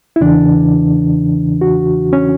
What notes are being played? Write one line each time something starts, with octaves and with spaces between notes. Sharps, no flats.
E4
E2 C#3 E3 D4
F#4
C#4